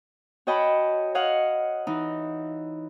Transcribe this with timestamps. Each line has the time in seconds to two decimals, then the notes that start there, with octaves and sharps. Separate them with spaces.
0.47 F#4 C#5 D#5 G5 A5 B5
1.15 C#5 D#5 F5 F#5
1.87 E3 D#4